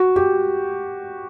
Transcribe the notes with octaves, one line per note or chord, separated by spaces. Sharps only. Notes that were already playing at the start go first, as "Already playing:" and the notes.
Already playing: F#4
G4